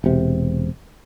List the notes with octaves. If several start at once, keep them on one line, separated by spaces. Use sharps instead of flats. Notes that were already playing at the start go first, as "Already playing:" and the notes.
E1 C3